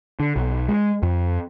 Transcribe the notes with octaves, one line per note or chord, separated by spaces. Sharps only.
D3
B1
G#3
F2